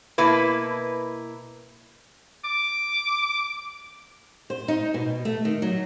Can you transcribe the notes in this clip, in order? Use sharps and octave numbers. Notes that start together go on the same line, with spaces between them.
B2 A#3 E4 B4
D6
C5
D#4
B2
A3
D#3
F#3